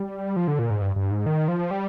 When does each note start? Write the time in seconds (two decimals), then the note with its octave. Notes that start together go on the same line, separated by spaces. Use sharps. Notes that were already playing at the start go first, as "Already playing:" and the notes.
Already playing: G3
0.36 F3
0.48 D3
0.59 A#2
0.70 G#2
0.81 G2
0.96 G2
1.11 G#2
1.26 D#3
1.48 F3
1.71 G3